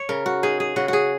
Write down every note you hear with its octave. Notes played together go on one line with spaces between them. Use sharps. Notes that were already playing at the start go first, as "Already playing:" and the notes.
Already playing: C#5
C#3 A#4
F#4
D#4 G#4
G#4
C#3 F#4
F#4 G#4